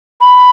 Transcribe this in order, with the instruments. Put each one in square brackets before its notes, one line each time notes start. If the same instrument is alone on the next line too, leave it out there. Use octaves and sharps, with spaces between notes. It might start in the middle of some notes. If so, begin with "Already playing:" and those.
[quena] B5